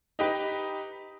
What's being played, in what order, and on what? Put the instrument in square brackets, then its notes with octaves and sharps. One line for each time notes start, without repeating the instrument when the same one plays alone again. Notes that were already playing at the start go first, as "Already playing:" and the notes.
[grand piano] D#4 G4 B4